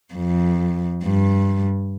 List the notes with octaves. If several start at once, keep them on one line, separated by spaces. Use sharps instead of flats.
F2
G2